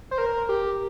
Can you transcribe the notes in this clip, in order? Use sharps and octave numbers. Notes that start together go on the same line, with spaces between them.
C5
A#4
G4